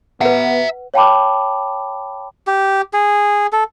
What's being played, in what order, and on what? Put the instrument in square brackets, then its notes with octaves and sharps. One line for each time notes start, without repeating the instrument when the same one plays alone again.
[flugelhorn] B3 [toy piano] B4 F#5 [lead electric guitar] E5 A#5
[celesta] C#5 F5 G5 A5 B5 D6
[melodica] G4
G#4
A4